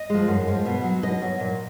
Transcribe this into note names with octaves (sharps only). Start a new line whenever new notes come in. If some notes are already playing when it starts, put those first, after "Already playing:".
Already playing: D#5
F3 G#3
F#2
F3 G#3
B2
F#3
B2 D#5
F#3
A#2